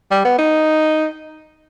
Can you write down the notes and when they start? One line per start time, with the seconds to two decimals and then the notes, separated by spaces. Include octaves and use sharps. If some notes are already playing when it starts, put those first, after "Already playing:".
0.11 G3
0.25 B3
0.38 D#4